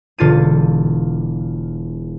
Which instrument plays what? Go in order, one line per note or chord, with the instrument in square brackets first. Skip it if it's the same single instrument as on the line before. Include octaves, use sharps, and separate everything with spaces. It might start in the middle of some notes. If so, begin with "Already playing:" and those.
[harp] E1 D3 F4 A6 C#7 D#7